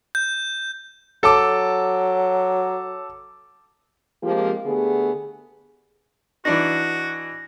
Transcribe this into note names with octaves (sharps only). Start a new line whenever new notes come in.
G6
F#3 A4 A5 D6
F3 G#3 A#3 C4 F4 G4
D3 A3 B3 G4 G#4
E3 D4 D#4 F#4 A#6